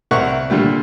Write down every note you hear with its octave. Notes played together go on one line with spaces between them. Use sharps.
C2 C4 A#4 E5 F#5 C#6
A#2 D3 G3 A3